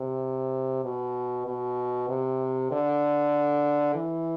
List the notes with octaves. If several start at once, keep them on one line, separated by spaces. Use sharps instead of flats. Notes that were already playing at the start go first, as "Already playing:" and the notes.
Already playing: C3
B2
B2
C3
D3
E3